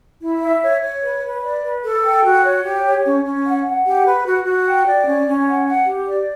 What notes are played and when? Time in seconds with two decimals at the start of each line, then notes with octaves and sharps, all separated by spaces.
0.21 E4
0.41 E5
0.61 C#5
0.82 C#5
1.02 B4
1.23 B4
1.42 D5
1.63 B4
1.83 A4
2.03 G5
2.24 F#4
2.43 C#5
2.64 G4
2.84 C#5
3.04 C#4
3.24 C#4
3.45 F#5
3.64 F#5
3.85 G4
4.05 B4
4.25 F#4
4.45 F#4
4.66 G5
4.86 D5
5.06 C#4
5.26 C#4
5.46 F#5
5.66 F#5
5.86 G4
6.06 D5